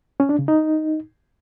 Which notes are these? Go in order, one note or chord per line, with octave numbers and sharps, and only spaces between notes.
C#4
D4
C#3
D#4